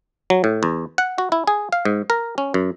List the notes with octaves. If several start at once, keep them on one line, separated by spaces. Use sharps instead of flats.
F#3
A2
E2
F#5
F#4
E4
G#4
F5
G#2
A#4
C#4
F#2